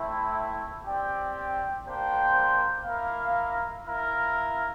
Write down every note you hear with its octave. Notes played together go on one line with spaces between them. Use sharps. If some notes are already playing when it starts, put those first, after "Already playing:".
Already playing: A3 C4 E4
C4 G4 D5 G5
A#3 D4 G4 C5 G5
A#3 E4 A#4 F5
E4 A#4 F5